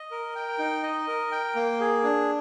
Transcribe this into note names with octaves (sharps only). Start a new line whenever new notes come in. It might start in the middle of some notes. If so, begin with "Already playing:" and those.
Already playing: D#5
A#4
G5
D#4
D#5
A#4
G5
A#3
G#4
D4